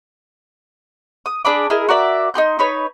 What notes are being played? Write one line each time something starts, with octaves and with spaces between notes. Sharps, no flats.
D#6
D4 G#4 B5 D6
E4 G#4 A#4 D#5
F#4 A#4 D5 E5
D#4 G4 C6 G6
D#4 B4 C#5